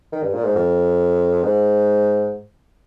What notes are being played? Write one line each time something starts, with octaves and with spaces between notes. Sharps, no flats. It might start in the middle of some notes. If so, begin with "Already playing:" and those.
D#3
G2
A#2
G#2
F2
G#2